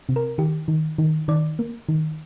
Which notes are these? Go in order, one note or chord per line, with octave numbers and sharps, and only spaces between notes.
C3
A#4
D#3 G4
D#3
D#3
D#3 D5
A#3
D#3